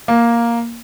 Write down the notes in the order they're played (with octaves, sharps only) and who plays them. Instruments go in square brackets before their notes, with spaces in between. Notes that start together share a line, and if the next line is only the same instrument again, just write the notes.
[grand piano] A#3